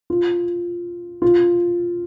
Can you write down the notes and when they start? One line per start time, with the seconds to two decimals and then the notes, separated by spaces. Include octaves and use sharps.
0.10 F4
1.22 F4